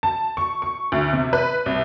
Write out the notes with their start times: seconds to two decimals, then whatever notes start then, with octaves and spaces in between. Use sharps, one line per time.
0.03 A5
0.37 C#6
0.62 C#6
0.92 D2
1.13 C3
1.33 B4
1.66 C2